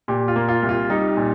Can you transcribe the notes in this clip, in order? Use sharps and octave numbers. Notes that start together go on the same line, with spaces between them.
A#2 G4
F4
A#3
F4
C2
F4
G3 D#4
A#2